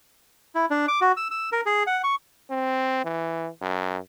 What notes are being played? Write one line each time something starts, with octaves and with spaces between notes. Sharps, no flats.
E4
D4
D6
F#4
E6
E6
A#4
G#4
F#5
C#6
C4
E3
F#2